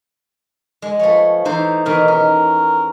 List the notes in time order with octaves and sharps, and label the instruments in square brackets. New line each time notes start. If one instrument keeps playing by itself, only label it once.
[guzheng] G#3
[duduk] F3 [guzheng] A3 B3 C#5
[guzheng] E3 C5 [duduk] D#4
[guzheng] E2 B2 D#3 [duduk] A#4
[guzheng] C#4 [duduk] A#4